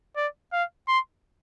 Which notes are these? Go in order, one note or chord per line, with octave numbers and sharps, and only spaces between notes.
D5
F5
C6